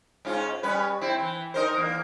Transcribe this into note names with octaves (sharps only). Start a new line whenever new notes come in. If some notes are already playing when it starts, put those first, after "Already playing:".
G#2 C#4 F4
G3 C#4 B4
C4 E4
E3
D#4 A#4 C5
E2 A#3